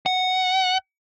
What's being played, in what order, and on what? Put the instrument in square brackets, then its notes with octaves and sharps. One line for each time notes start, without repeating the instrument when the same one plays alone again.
[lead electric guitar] F#5